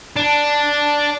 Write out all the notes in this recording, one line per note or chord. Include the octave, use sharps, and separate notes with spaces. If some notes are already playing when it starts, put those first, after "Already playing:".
D4